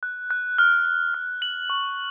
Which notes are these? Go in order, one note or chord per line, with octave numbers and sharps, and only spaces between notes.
F#6
F#6
F6
F6
F6
F#7
C#6